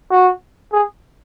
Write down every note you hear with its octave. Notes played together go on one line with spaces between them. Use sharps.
F#4
G#4